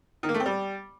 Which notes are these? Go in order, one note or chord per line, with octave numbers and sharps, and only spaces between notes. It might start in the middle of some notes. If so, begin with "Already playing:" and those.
D#3
A#3
A3
C4
G3